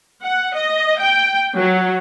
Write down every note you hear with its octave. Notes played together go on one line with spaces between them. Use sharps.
F#5
D#5
G5
F#3